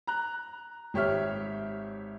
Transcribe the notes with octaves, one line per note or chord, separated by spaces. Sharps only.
A#5 F#6
G#1 G4 C#5 E5 F6